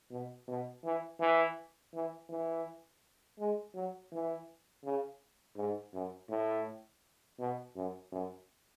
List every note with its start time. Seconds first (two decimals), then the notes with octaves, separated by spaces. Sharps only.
0.11 B2
0.48 B2
0.84 E3
1.20 E3
1.94 E3
2.29 E3
3.39 G#3
3.75 F#3
4.12 E3
4.85 C#3
5.57 G#2
5.94 F#2
6.30 A2
7.39 B2
7.76 F#2
8.12 F#2